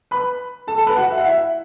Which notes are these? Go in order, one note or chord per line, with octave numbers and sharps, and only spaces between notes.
B4 B5
A4 A5
A4 A5
B4 B5
F#4 F#5
E5
F#5
E4 E5